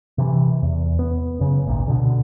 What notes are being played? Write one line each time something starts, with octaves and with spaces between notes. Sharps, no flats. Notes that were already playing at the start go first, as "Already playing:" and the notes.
C3 E3
E2
B3
F#1 C#3
G#1 D2 A#2
B2 D3